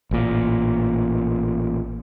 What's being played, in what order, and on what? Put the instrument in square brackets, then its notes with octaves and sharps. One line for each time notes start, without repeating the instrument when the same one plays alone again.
[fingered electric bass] A1 A#2